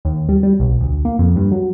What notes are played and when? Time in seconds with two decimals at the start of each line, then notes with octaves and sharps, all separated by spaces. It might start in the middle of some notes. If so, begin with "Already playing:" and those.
0.05 D#2
0.29 G3
0.43 G3
0.60 B1
0.81 D2
1.05 A#3
1.19 F2
1.36 G2
1.51 F#3